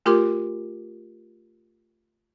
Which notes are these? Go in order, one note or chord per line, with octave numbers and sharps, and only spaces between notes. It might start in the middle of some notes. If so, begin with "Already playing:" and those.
A3 F4 G4 A#4 C6 D6